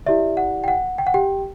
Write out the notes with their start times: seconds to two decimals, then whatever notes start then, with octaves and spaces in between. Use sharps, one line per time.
0.06 E4 G4 D5 E5
0.37 F#5
0.64 G5
0.68 F#5
0.98 G5
1.07 F#5
1.14 G4 G5